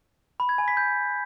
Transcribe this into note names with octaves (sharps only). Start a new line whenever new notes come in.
B5
G#6
G#5
B6
G6